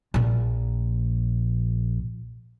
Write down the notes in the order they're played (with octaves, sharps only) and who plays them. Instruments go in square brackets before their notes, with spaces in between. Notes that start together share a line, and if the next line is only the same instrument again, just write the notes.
[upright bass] A#1 A#2